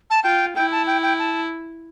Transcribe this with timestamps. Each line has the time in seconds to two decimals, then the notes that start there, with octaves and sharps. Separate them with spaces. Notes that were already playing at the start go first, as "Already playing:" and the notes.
0.10 A5
0.24 F4 G5
0.55 E4 G5
0.72 A5
0.87 G5
1.03 G5
1.19 A5